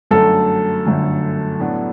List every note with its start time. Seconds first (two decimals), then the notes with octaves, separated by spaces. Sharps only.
0.11 G1 F#2 D3 A3 A4
0.85 G1 F#2 D3 A3
1.60 A2 F#3 B3 D4 F#4